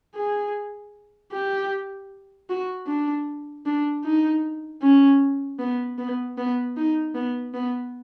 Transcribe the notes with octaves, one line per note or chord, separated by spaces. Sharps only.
G#4
G4
F#4
D4
D4
D#4
C#4
B3
B3
B3
D#4
B3
B3